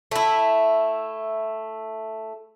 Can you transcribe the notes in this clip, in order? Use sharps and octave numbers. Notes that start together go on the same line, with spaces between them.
A3 E4